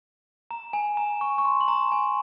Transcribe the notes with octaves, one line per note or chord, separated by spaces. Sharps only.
A#5
G#5
A#5
C#6
C#6
C6
C6
A#5
G#5